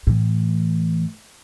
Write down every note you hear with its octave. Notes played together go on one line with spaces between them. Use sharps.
A2 E3